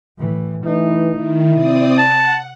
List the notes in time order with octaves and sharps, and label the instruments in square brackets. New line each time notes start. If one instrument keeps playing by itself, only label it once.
[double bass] A2 E3
[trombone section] E3 [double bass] A3 D#4
[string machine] D#3 [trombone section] E4
[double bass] C3 [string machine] C4 D5 D#6
[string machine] F#5 [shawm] A5